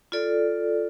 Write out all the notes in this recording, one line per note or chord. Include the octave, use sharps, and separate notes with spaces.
F4 A4 D5